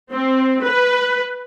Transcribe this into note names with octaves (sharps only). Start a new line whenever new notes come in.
C4
B4